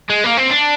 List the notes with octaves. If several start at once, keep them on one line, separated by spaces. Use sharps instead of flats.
G#3
A#3
C4
D4